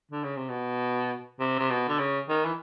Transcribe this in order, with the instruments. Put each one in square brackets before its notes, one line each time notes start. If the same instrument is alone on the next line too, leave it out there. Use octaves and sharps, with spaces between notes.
[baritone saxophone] D3
C#3
C3
B2
C3
C3
B2
D3
C#3
D#3
E3